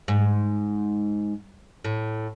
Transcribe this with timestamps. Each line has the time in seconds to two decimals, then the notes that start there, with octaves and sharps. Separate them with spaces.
0.08 G#2
1.84 A2